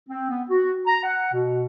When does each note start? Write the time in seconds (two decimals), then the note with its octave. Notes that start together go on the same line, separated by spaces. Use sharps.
0.09 C4
0.29 B3
0.49 F#4
0.86 A#5
1.04 F#5
1.33 B2